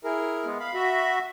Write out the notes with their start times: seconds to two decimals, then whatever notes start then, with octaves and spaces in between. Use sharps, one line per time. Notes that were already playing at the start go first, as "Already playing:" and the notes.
0.04 E4 G#4 A#4
0.44 G#3 B3
0.60 F5 B5
0.74 F#4 E5